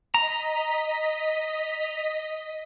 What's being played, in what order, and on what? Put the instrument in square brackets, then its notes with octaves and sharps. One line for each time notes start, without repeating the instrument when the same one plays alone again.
[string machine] D#5 B6 [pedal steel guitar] A#5